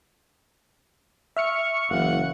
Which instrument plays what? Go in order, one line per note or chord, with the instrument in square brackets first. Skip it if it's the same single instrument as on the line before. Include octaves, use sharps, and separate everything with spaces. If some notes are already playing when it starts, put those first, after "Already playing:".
[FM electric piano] E5 F6 C#7 [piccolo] C#6
[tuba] F#1 [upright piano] E3 F5 [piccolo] F#5